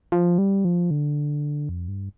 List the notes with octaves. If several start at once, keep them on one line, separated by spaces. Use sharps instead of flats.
F3
G3
F3
D3
F2
G2